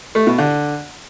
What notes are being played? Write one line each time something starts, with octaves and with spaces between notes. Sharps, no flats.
A3
B2
D3